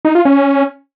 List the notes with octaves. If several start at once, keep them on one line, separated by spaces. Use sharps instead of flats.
D#4
F4
C#4